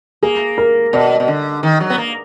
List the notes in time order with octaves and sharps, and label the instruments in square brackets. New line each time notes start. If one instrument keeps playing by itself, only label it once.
[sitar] A#3 [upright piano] G#4
[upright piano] A#4
[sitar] B2 [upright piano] D5
[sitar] B2
D3
D#3
F#3
B3
A#3